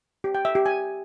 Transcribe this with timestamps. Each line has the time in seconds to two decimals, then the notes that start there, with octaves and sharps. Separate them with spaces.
0.24 G4
0.35 G5
0.45 E5
0.55 G4
0.66 G#5